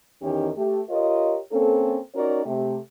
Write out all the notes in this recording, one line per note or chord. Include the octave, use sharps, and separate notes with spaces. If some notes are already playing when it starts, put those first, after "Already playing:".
E2 D#3 E3 C#4 D#4 G4
A3 G4
F4 G4 A#4 C#5 D#5
A#3 C4 C#4 A4
C#4 D#4 F#4 A#4 C#5 D5
C3 A3 G4